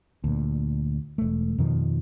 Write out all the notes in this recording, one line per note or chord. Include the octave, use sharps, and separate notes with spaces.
D2 A#2
E1 A3
F2 B2 D#3 F3